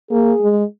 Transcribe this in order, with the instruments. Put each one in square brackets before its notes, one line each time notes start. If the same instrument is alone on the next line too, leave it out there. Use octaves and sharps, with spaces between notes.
[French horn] A#3 [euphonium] G#4
[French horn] G#3